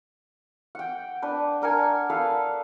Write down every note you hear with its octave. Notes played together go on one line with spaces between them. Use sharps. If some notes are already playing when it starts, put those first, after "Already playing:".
F#5 G5
D4 B4
D4 A#4 F#5 G#5
A4 B4 F5